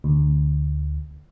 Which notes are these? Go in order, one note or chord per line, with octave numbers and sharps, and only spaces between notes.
D2